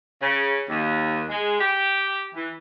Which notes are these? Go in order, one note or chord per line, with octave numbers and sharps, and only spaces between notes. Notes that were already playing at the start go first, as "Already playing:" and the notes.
C#3
D#2
G#3
G4
E3